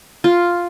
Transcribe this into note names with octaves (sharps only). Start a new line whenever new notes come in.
F4